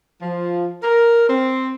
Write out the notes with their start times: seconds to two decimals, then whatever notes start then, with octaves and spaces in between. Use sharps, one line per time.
0.22 F3
0.83 A#4
1.29 C4